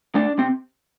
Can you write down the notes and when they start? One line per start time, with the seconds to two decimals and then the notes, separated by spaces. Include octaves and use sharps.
0.15 A3 D4
0.38 C3 C4